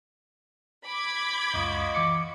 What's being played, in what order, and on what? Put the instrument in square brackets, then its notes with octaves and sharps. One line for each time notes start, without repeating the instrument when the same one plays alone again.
[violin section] B5 D6 G#6
[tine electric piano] C#2 F#2 [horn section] F4 F#4 D#5
[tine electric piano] E3 D6 C#7